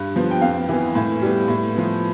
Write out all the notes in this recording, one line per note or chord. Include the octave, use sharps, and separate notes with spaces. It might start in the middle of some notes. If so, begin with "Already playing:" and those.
Already playing: G2
F3 B3
G5
F2 F5
E3 B3
A2
G3 B3
A2
F3 B3